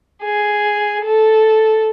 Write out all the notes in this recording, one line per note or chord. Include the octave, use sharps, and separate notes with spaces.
G#4
A4